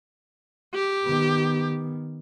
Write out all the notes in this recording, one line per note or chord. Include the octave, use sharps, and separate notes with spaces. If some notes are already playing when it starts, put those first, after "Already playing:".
G4
D#3 B3